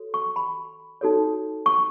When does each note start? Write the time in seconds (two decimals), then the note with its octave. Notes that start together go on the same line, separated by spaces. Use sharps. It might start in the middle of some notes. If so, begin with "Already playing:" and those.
Already playing: F#4 A4 C#5
0.14 C#6
0.36 B5
1.01 D#4 F#4 A4 C#5
1.66 C#6